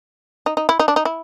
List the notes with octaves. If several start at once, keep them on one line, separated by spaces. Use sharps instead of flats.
D#4
D#4
E4
D#4
D4
D#4
E4